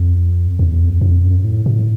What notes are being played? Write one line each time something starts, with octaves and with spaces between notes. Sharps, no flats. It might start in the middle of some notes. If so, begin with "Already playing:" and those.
Already playing: F2
E2
F2
F2
F#2
A2
A2